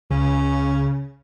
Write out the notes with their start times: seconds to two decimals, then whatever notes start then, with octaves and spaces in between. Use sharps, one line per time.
0.11 C#2 C#3 C#4